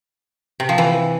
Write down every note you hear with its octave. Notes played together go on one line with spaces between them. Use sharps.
C3
F3
E3